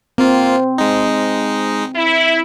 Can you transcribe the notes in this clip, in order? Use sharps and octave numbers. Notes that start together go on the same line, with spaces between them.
A#3 C4 F4
G#3 D#4
E4